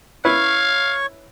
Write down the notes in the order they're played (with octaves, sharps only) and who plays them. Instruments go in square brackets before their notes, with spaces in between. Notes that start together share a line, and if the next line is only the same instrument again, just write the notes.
[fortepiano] C#4 E4 B4 [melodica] C#5 C#6 [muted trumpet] F5